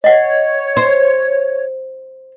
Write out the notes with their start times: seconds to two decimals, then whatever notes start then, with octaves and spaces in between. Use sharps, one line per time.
0.04 C#5 D#5 F#5
0.77 C5